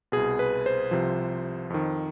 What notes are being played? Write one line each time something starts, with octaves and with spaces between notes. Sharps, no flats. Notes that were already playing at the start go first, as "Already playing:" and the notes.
C2 B2 G#4
B4
C5
C2 C3 F3
F2 D#3